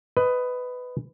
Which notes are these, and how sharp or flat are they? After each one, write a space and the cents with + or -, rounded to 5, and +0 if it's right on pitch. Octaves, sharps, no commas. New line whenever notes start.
B4 +15 D#5 +0